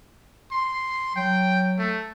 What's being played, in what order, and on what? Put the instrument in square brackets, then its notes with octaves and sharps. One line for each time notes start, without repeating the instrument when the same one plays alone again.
[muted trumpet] C6
[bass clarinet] F#3 [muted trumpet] G5
[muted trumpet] A3